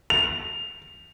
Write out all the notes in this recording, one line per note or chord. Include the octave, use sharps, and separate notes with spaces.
F7